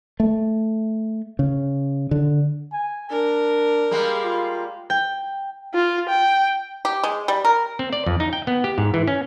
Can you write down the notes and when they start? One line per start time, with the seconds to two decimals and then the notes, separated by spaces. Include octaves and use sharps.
0.20 A3
1.39 C#3
2.11 D3
2.73 G#5
3.10 D4 A#4
3.91 G3 G#3 A#3
4.24 F4
4.90 G5
5.74 F4
6.09 G5
6.85 G4
7.03 G#3
7.28 G3
7.45 A#4
7.79 C4
7.93 D5
8.06 F2
8.20 D#4
8.33 G5
8.47 B3
8.64 G4
8.78 G#2
8.94 E3
9.08 C#4